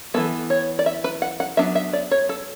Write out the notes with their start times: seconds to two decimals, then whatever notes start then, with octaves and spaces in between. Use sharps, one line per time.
0.14 E3 G#3 B3 A4
0.50 C#5
0.79 D5
0.86 E5
1.04 B4
1.22 F#5
1.40 F#5
1.57 F#3 B3 D4 E5
1.75 E5
1.93 D5
2.11 C#5
2.29 A4